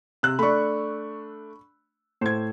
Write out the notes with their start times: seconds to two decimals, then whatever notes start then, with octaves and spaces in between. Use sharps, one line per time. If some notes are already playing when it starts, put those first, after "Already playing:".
0.23 C3 E6 F#6
0.39 A3 D4 B5 C#6
2.21 A2 C5 G#6